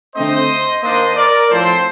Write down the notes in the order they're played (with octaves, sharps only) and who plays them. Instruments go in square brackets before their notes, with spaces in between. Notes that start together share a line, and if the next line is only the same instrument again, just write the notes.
[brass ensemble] D3 A3 C4 D#4 C5 D#5
D#3 A#3 D4 C5 D#5
A#4 D5
A2 F3 C4 A4 C5